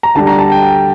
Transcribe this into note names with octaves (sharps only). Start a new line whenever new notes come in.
A#5
D2 D3 G3 A5
A#5
A5
G5